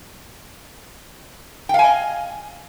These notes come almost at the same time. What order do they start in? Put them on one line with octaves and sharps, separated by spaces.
G5 F5 G#5 D#5